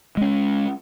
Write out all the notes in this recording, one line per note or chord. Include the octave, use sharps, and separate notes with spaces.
G#3 C#4